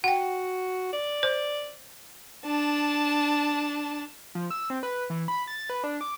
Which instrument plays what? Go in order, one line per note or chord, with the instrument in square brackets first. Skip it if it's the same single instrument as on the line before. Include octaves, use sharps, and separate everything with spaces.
[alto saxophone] F#4 [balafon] F#5 G5
[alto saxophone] D5
[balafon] C5
[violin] D4 A5
[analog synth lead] F3
E6
C4
B4
E3
B5
A6
B4
D4
D6